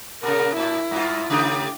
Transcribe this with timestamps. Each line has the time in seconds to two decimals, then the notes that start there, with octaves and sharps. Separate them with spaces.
0.23 A#2 C#3 A#4
0.57 A2 E4
0.91 G2 F4
1.30 C#3 A3 G4